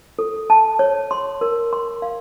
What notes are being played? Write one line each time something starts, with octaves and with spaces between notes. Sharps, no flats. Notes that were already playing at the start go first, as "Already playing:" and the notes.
A4
A5
C#5
C6
A#4
C6
F5